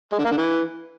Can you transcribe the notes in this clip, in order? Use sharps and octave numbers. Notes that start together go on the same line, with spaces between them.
G#3
D3
A#3
D3
E3